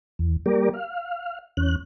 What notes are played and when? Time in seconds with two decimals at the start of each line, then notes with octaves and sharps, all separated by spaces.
0.19 E2
0.46 G3 A#3 G4 A#4 D5
0.74 F5
1.57 E2 C#4 F#6